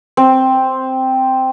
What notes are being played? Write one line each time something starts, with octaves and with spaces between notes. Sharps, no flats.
C4